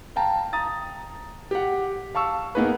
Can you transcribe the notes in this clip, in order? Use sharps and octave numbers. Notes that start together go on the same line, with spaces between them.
F5 G5 A5 A#5
A#5 D#6 A6
G4 F#5
F5 A5 C#6 E6
A#3 B3 D#4 G#4 B4